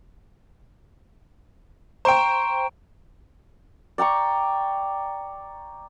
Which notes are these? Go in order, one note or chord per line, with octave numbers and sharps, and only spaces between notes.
C5 G5 A#5 C#6 D7
D5 G5 A#5 C#6